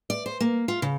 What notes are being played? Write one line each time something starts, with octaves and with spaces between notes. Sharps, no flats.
D5
C5
A#3
F4
C#3